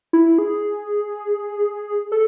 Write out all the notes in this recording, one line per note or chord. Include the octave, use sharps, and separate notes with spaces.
E4
G#4
A4